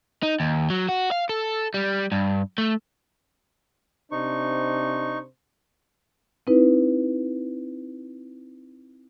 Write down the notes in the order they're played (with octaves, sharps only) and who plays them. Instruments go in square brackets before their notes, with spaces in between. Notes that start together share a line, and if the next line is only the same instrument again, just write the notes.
[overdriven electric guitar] D#4
D#2
F#3
F#4
F5
A4
G3
G2
A3
[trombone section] C3 D4 C5 [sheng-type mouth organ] D#4 C#6
[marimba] C4 D#4 E4 B4